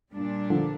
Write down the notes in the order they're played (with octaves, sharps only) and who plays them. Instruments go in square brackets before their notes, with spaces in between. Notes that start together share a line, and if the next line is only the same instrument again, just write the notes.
[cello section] A#2 G3 D4
[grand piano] D3 F3